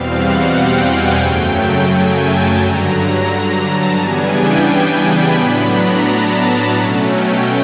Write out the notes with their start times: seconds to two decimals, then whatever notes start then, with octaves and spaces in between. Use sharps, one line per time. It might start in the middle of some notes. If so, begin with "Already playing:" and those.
Already playing: E2 B2 G3 C4 F5
0.14 F#5
0.48 G5
0.83 G#5
1.18 F#2 C#3 F#3 A3 G5
1.87 G#5
2.21 A5
2.57 G2 D3 F#3 A#5
2.91 A#5
3.26 A#5
3.61 A5
3.95 C#3 E3 G3 B3 D4 G#5
4.30 G5
4.65 G#5
5.00 B5
5.34 A2 F#3 B3 D4
5.69 A#5
6.04 A5
6.74 B2 F#3 A3 C#4
7.09 G5